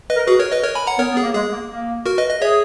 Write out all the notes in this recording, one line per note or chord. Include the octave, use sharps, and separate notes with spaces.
B4 D#5
A#4
F#4 G#4 B4
A#4 C#5
B4 D#5
A#4 C#5
G#5 B5
F#5 A#5
B3 A#4 C#5
B3
G#4
A#3
G#3 G#4
A#3
A#3
F#4 A#4
B4 D#5
D#5
G#4 C#5 E5